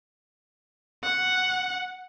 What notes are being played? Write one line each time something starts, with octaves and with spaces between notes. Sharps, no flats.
F#5